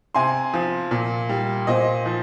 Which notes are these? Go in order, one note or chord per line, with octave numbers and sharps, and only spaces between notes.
C3 G#5 C6
F3
A#2
G3
A#2 C5 D#5
F3